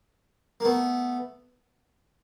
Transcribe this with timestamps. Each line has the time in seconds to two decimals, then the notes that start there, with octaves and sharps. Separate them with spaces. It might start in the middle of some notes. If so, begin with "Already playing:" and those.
0.60 A#3
0.65 A3 B3